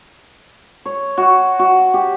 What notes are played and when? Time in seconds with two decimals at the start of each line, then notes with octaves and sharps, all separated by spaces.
0.85 C#5
1.18 F#4
1.59 F#4
1.94 G4